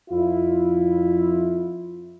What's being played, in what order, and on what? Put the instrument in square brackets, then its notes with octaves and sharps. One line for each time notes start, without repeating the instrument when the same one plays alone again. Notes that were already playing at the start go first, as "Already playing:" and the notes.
[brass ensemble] F2 E4 F4